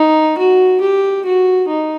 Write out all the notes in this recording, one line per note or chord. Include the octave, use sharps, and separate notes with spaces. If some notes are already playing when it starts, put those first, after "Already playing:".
Already playing: D#4
F#4
G4
F#4
D#4